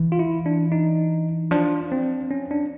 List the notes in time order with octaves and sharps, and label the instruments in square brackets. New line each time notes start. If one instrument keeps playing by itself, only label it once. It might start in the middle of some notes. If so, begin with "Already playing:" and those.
Already playing: [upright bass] E3
[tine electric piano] F4
E4
D4
D#4
[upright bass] F3 [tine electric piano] D4
[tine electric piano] C4
C#4
D4